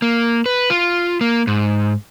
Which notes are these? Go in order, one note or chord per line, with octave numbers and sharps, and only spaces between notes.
A#3
B4
F4
A#3
G#2